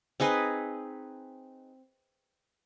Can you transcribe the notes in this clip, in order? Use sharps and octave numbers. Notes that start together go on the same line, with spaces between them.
C4 D#4 G#4 B4